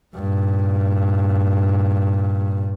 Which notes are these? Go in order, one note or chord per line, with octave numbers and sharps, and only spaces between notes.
G2 A#2